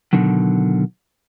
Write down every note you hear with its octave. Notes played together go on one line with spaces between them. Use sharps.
B2 D3 D#3 F#3